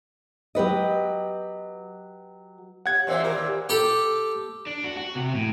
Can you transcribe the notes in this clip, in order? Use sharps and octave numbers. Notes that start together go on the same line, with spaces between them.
F#3 G4 B4 D#5
G4 C#5 F5 F#5 G#6
E2 A#2 C4 E5 E6
D#2 A#2 G4 A#4
G4 A4
D4
F#4
F#4
C3
A2